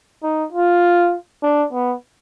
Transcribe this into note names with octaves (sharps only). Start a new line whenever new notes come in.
D#4
F4
D4
B3